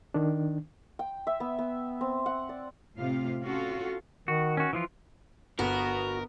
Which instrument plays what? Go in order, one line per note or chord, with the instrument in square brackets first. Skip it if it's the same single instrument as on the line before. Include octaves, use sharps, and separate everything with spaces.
[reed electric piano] D#3 D4
[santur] G5
E5
B3
B3
C4
F#5
D5
[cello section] A2 C3 F4 F5
C#4 F4 F#4 A4
[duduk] D#3 [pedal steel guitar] F#4
[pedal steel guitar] C#4 F#4
E3 F3 F4
[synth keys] G1 [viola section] B3 [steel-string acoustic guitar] F#4 [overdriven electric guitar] A#4